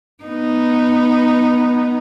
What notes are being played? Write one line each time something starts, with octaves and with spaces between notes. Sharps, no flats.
B3 D#4